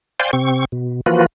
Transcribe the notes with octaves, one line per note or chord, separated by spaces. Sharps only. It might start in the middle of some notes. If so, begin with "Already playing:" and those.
C5 D5 F5 G5 G#5 C6
C3 C4 C#6
B2
E3 F3 A#3 F4 F#4 B4